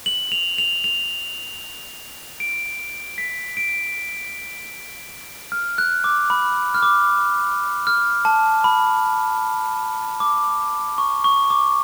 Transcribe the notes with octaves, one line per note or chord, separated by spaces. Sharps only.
F#7
F7
F7
F7
D7
B6
D7
F6
F#6
D6
B5
F6
D6
F6
A5
B5
D6
C#6
C#6
D6